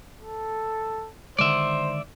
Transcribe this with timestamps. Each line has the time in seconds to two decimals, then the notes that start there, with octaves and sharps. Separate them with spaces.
0.22 A4
1.39 D3 D#3 G#3 C5 D5 E5